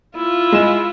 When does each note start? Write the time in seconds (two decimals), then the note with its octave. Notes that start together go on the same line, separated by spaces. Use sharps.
0.16 E4 F4
0.52 G#3 E7